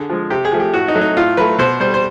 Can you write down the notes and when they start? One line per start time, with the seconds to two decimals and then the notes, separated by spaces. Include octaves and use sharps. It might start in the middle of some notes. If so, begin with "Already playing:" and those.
Already playing: D3 G#4
0.09 F3 G#3
0.30 C3 G4
0.45 G#4
0.52 F3 A3
0.60 G4
0.73 A2 F#4
0.88 D#4
0.95 F#3 A3
1.01 D#4
1.17 A2 F4
1.37 F#3 A3 B4
1.59 B2 C5
1.80 G3 C5
1.94 C5